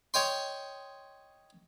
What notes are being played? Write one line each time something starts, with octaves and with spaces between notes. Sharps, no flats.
C#5 D#5 G5 C6